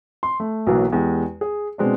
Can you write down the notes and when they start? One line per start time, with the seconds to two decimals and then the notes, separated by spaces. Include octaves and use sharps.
0.23 C6
0.40 A3
0.67 B1 B2 E3 F#3 A#3
0.92 E2 G#3 G4
1.41 G#4
1.78 B2 G#3 C4 D4